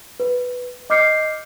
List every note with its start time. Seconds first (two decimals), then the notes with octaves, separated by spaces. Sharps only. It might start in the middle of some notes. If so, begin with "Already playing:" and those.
0.20 B4
0.90 D#5 D6 F6 G6 C7 C#7